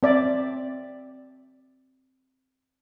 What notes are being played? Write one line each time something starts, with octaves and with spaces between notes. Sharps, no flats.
C4 D5 E5